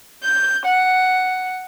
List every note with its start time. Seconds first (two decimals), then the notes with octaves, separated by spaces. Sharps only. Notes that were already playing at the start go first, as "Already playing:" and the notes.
0.23 G6
0.66 F#5